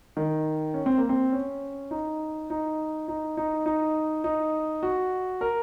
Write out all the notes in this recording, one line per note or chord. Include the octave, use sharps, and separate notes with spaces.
D#3
C#4
C4
A#3
C4
C#4
D#4
D#4
D#4
D#4
D#4
D#4
F#4
A#4